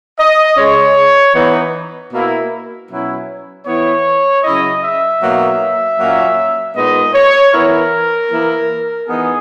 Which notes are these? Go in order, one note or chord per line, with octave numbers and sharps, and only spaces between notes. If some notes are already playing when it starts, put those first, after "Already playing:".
D#5
C#3 G#3 C#4 C#5
E3 B3 D#4
B2 A#3 E4
B2 F#3 C#4 E4
E3 B3 E4 C#5
C#3 F#3 C#4 E4 D#5
E5
B2 F#3 A#3 D#4
A#2 F#3 A#3 C#4
A#2 G#3 B3 D#4 D#5
C#5
E3 B3 E4 A#4
E3 A#3 E4
E3 B3 D#4 G#4